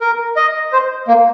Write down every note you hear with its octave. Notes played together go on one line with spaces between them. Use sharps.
A#4
D#5
C5
A#3